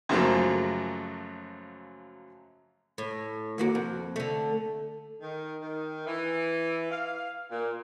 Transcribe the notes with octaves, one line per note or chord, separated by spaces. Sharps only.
F#2 C#3 F3 F#3 A3 A#3
A2
D#2 A#3 F#4
F2
D3 A3
D#3
D#3
E3
F5
A#2